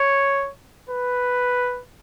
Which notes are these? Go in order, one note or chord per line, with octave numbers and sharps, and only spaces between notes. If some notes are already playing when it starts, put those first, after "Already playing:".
Already playing: C#5
B4